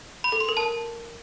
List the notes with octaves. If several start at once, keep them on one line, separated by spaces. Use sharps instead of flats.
B5
A4
C6
A#4
A5